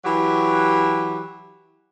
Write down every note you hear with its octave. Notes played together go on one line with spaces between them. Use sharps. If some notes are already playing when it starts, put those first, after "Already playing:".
E3 F#3 G4